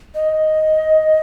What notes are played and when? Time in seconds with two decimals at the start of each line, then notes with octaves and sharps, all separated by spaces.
0.15 D#5